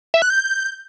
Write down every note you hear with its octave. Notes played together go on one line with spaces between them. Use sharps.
E5
F#6
G6